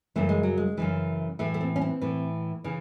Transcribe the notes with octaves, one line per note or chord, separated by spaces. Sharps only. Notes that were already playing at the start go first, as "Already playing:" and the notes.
F#2 C#3 E3 A3
G#3
F#3
G#3
F#2 C#3 E3
A2 E3 A3
A3
C4
C#4
C4
A2 E3
C#3 E3